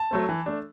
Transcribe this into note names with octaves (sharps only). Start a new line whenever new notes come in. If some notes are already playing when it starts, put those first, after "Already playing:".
Already playing: A5
F#3 A3 C4
E3
A3 D4